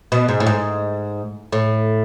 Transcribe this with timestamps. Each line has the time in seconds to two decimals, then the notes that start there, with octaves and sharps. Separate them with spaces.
0.12 B2
0.28 G#2
0.40 A2
0.46 G#2
1.52 A2